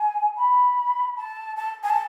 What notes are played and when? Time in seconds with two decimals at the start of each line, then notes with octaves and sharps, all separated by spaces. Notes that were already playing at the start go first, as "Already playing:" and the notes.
Already playing: G#5
0.37 B5
1.17 A5
1.57 A5
1.83 G#5
1.90 A5